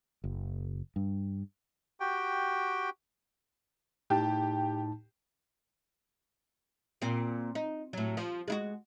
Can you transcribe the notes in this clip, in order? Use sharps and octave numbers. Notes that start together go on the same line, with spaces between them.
F#1
G2
F#4 G4 G5
A2 D#4 G4 A5
A#2 C4
D#4
A2 F#3
F3
G#3 E4 F#4